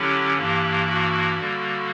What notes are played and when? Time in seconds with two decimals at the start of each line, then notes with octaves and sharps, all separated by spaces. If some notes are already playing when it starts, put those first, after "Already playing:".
Already playing: D3 F#3 C#4 E4 G4
0.37 G2 E3 A#3 E4 G4
0.88 F#4
1.39 D3 G3 A#3